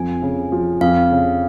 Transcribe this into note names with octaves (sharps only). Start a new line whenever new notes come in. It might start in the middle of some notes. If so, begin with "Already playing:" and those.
Already playing: F2 F4 G#5
C#3
F3
F2 F5
C#3